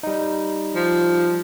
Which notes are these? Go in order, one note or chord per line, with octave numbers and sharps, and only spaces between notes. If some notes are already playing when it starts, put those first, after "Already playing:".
G3 D#4
F3